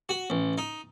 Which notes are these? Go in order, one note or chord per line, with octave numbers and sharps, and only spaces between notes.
F#4
A1
D#4